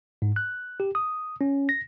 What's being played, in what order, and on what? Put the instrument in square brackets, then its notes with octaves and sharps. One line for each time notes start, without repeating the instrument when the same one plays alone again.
[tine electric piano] G#2
F#6
G4
D#6
C#4
A#6